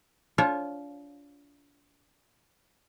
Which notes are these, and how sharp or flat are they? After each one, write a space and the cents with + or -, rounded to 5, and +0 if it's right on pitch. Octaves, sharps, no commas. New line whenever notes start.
D4 -35 F4 +0 C#5 -35